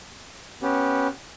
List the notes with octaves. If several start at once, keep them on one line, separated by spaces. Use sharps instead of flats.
B3 C#4 G4